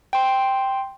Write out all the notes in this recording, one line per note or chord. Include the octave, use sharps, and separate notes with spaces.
G5 C6